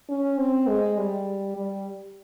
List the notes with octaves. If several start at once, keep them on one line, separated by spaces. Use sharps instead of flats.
C#4
C4
G#3
G3
G3